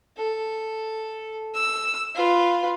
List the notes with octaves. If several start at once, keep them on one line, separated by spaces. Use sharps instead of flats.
A4
E6
F4 B4